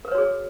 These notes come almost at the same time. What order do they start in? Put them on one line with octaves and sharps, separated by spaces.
A#4 B4 C#5 F#4 G#4